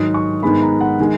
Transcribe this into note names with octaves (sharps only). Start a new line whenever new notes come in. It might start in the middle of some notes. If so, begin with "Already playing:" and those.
Already playing: G#2 D#3 F#3 D#6
C#6
G#2 D#3 G#3 B3 B5
A#5
F#5
D#3 G#3